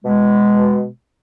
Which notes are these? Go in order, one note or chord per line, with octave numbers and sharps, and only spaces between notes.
B2 G#3